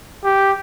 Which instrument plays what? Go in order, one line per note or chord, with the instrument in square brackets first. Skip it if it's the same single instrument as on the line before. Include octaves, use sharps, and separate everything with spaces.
[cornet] G4